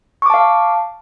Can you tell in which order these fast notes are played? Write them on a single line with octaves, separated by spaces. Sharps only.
C#6 D6 A5 F5